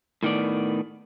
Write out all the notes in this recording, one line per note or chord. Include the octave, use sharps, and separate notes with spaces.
A2 D#3 B3 D5